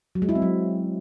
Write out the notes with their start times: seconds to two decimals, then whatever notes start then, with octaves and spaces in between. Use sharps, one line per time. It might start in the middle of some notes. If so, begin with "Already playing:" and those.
0.15 F#3
0.22 G#3
0.29 E4
0.35 C4
0.42 F#3